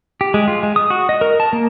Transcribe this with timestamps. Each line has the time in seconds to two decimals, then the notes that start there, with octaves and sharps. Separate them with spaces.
0.21 G4
0.34 G#3
0.48 F4
0.63 G#3
0.76 D#6
0.90 F#4
1.09 D#5
1.21 A#4
1.40 A5
1.53 A#3